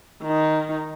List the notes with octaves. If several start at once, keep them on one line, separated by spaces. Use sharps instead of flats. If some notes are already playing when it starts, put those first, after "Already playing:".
D#3 D#4